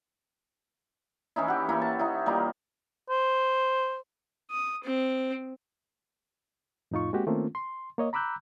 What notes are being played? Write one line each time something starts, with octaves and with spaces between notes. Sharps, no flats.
E3 C#4 D#4 E4
G4 F#5
A#3 E4 C#5
A5
D#4 E4
G3 A#3 D#4 F4
C5
D#6
C4
F2 A2 D#4 F4 C#6
G#3 A#3 C4 F#4 G4
D#3 A3 A#3 C4 C#4 F4
C6
A#3 C#5 D#5
A#5 B5 D6 E6 F#6 G6